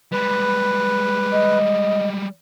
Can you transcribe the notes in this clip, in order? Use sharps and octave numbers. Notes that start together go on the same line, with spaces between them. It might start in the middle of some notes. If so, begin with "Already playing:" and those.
G3 G#3 B4
D#5